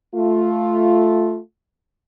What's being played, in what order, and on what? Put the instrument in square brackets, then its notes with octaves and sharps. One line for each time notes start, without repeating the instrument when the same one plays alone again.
[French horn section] A3 F4